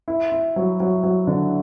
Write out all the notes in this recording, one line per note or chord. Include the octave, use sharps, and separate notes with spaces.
E4
E4
F#3
F#3
F#3
D3